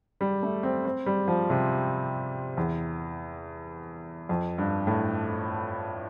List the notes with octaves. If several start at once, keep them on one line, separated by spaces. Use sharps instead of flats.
G3
A3
C4
C4
G3
F3
C3
E2
F2
G2
A2